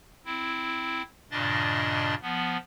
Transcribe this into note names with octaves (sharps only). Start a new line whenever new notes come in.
C4 E4
G2 A#2 C#3 D4 D#5 A6
F3 B3